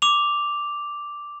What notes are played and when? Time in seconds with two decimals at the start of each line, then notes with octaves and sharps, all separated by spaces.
0.02 D6 F7